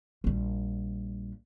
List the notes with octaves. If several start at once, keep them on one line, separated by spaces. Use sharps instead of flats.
A#1 G3